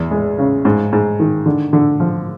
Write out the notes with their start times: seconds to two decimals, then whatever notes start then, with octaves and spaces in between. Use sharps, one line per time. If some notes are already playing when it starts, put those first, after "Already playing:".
Already playing: E2
0.11 G#3
0.38 C#3
0.65 G#2
0.93 G#2
1.20 D#3
1.46 D3
1.73 D3
2.00 F3